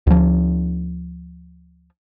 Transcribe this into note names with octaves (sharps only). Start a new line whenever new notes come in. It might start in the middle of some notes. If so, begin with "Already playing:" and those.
D2 F3